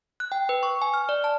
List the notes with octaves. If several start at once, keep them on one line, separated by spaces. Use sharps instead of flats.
F#6
G5
B4
C#6
G#5
F6
D5
A5